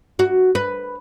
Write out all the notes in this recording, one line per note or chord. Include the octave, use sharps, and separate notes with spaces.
F#4
B4